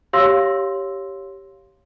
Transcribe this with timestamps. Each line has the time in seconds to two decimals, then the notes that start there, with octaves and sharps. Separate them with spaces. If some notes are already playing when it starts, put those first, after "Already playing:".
0.13 G4 C#5 F5 C6 E6 A#6